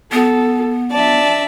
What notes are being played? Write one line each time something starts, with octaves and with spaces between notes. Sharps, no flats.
B3 A4
D4 D5 E5 A5